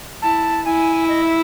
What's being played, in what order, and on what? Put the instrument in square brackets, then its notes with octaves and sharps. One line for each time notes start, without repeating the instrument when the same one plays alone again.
[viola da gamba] E4 [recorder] A5
[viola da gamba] E4 [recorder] G#5
[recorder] D#5
E5